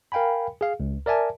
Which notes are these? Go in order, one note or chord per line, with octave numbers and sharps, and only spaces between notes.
A#4 F5 G5 G#5 B5
G#4 F5
C#2
A#4 D5 E5 G#5 A5